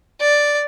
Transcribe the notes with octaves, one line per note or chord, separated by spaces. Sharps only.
D5